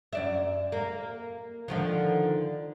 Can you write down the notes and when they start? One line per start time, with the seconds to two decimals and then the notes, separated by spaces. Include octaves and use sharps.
0.13 F#2 D5 E5
0.72 A#3
1.68 D3 D#3 F3